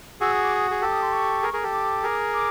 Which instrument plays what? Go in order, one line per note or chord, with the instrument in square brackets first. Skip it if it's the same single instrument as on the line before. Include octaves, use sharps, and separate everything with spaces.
[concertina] F#4 G#4 [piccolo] E6
[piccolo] D#6
D6
D#6
[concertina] G#4
[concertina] G4 A4 [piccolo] E6
[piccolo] D#6
C6
C#6
[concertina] G#4 A#4
G#4 A#4
G4 A4
[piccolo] D6
[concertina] G#4 A#4
[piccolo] D6